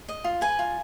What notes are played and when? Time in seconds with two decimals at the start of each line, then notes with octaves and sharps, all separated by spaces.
0.09 D#5
0.24 F4
0.41 B4 G#5
0.59 F4